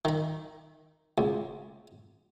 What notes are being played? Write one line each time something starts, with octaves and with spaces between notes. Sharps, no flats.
D#3 B5
C#2